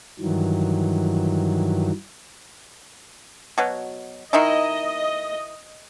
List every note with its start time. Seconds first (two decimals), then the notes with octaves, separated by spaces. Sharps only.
0.20 G2 D#3 E3 F#3
3.58 B2 F#3
4.33 D#3 D#4 E4 D#5